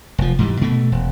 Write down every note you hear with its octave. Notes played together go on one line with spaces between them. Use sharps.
F1 F3
G#2 E3 G3
B2 A3
E1